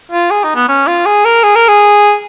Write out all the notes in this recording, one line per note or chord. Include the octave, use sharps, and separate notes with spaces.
F4
G#4
D#4
B3
C#4
F4
G#4
A#4
G#4
A#4
G#4